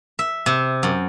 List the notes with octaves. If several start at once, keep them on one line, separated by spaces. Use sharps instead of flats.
E5
C3
F#2